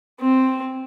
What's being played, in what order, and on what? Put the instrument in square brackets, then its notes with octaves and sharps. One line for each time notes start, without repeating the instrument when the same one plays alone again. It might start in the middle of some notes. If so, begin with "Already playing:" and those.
[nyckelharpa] C4